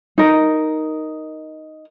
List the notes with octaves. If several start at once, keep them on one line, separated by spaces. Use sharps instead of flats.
D#4 A#4